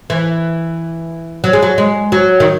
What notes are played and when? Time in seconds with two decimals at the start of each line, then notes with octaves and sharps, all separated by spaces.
0.10 E3
1.44 F#3
1.53 G#3
1.62 F#3
1.78 G#3
2.12 F#3
2.40 D#3